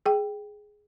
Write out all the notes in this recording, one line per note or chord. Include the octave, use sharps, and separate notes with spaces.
G#4 G5